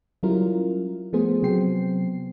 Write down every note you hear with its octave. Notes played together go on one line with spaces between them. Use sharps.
F#3 G3 C#4 E4 F4 A#4
F3 A3 B3 G#4 C5
C3 F#3 B3 C5 G5 C7